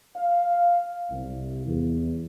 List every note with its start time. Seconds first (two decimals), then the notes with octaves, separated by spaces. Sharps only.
0.16 F5
1.11 C2
1.67 E2